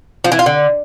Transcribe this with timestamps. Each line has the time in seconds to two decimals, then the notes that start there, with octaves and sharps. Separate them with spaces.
0.24 F3
0.32 E3
0.39 F4
0.46 D3